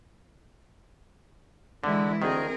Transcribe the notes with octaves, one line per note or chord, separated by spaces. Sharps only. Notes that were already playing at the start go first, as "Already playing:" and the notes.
D3 E3 G#3 E4
D2 D#3 C4 G#4 A#4